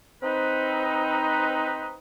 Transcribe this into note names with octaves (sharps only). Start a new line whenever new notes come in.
C4 D#4 B4